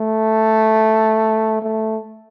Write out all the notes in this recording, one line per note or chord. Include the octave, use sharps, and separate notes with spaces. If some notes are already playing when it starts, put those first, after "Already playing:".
Already playing: A3
A3